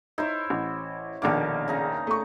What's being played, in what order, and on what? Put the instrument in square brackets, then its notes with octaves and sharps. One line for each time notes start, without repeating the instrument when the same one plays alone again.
[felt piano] D#4 [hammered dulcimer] E4 C5 C#5
[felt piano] A1
[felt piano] A#1 D#3 D6 [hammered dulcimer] B2 D3 A#3
[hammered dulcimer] C#3 D#4 A#5
[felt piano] A3 C#6